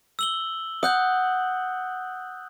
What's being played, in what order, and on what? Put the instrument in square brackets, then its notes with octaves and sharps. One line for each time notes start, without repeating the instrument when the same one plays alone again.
[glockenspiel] E6 F#7 G7
[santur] F#5 [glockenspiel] D#6 F#6 G6